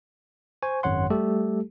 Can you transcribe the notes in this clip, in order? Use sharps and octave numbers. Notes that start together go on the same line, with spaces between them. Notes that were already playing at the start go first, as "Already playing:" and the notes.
C5 G#5 C#6
G#1 F#2 C#5 F#5 C6
G3 A3 G4 A4